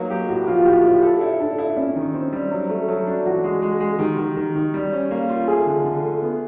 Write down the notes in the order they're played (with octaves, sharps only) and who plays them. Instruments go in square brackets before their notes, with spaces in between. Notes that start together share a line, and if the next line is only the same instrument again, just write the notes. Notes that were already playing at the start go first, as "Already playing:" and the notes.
Already playing: [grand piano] F#3 A#3 D#4 [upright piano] B4
[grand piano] G4
[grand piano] A2 [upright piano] F#4
[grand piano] F3 [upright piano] F4
[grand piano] A2 [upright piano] G4
[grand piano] A2
A4
E4
[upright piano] D4 [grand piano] A4
[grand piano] E4
[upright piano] C#4 [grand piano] E4
[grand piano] D#3
C4
G3
F#3
A3
F#3
D4
[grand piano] E3 [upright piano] F#4
[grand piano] G#3
G#3
G#3
[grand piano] D#3 [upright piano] G4
[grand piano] D#3
D#3
D#3
G3
C#4
A#3
F4
[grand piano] A3 [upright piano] G#4
[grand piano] D3
D3
A3
B3